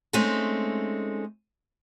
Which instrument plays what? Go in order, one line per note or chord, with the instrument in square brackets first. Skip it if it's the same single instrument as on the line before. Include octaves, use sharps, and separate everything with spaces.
[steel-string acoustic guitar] G#3 A3 C4 C#4 D#4